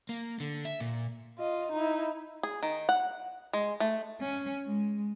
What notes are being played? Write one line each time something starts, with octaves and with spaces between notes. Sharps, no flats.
A#3
D3
E5
A#2
F4 D#5
D#4 E4
G#4
D#3
F#5
G#3
A3
C#4
G#3